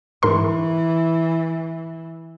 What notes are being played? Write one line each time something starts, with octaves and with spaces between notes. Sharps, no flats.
G#2 E3 A#4 C6